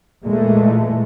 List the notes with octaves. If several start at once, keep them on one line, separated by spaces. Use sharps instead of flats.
A#2 E3 G#3 A3